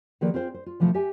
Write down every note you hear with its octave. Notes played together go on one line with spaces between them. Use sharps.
D#3 F3 A#3 G#4 B4 D5
C4 F4 G#4 C5
C5
F4
C3 E3 F3 A3
G4 E5 G#5